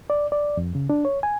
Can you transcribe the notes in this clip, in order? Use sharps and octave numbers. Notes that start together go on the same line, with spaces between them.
D5
D5
F2
C#3
D4
C#5
G#5